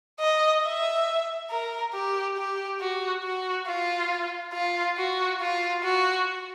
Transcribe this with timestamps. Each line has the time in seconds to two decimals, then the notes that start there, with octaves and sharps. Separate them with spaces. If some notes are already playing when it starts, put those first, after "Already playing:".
0.20 D#5
0.64 E5
1.50 A#4
1.93 G4
2.37 G4
2.80 F#4
3.23 F#4
3.67 F4
4.53 F4
4.97 F#4
5.41 F4
5.83 F#4